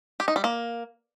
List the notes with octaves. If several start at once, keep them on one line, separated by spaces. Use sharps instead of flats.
G4
D#4
G3
A#3